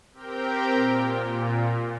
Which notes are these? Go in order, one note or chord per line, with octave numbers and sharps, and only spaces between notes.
C4 G4 A#4 G5
A#2